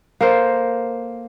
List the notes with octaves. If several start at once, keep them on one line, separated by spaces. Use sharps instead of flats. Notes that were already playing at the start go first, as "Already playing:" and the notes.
A#3 A4 A#4 C5